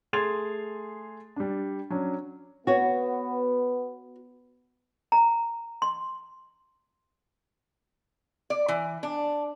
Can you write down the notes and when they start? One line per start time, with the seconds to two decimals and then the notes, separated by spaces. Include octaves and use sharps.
0.13 A3 G#4 C6 G#6 A6 F7
1.36 G3 D4
1.90 F#3 C#4 D4
2.67 B3 F#4 C#5
5.12 A#5
5.82 C6
8.50 D5
8.68 E3
9.03 D4